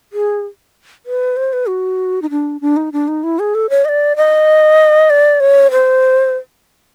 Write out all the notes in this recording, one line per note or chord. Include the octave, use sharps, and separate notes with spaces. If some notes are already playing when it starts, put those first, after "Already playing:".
G#4
B4
C5
B4
F#4
D#4
D4
D4
D#4
D4
D#4
E4
G#4
A4
C#5
D#5
D5
D#5
D5
C#5
C5